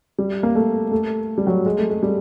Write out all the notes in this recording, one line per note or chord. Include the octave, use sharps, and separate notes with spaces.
G3
A#3
A3
A3
G3
F#3
G#3
A3
G#3
G3